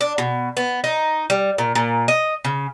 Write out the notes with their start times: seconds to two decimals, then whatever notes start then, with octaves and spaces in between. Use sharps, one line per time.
0.01 D4
0.18 B2
0.57 B3
0.84 D#4
1.30 G3
1.58 A#2
1.75 A#2
2.08 D#5
2.45 C#3